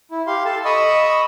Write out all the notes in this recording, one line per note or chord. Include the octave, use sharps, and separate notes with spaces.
E4
G4 F5 C6
A4 A5
D#5 B5 C#6 D#6 E6